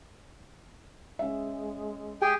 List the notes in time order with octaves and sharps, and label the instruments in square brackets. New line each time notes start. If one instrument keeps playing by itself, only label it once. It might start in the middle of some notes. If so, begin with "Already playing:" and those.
[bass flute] G#3 [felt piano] C#4 E5
[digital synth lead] G4 [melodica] G#4 G5 G#5